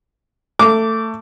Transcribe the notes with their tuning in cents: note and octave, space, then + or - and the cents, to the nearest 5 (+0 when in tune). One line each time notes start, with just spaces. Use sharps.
A3 +20 D6 -15